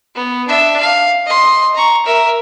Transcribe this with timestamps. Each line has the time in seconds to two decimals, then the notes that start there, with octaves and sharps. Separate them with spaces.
0.15 B3
0.48 D4 E5
0.81 F5
1.26 D#5 C6
1.75 A#5 C#6
2.06 A#4 E5